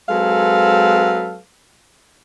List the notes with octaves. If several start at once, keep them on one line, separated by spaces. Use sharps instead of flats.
F#3 G#3 C4 A4 B4 F5